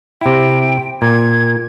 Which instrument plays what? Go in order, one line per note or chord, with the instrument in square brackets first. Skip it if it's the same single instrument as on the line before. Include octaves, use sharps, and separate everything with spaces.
[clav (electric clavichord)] C3 E4 [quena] G5
[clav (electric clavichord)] A#2 [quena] G#6